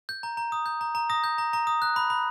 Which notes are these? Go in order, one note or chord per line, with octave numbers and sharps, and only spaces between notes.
G6
A#5
A#5
D#6
G6
A#5
A#5
D#6 A#6
G6
A#5
A#5
D#6
F#6
B5
B5